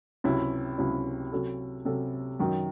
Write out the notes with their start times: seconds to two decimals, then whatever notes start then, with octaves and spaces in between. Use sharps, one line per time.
0.24 C#2 C3 F#3 C#4 E4
0.78 C#2 C3 F#3 C#4 E4
1.32 C3 F#3 C#4 F#4 A4
1.85 C3 F#3 C#4 F#4 A4
2.40 F#2 D#3 F#3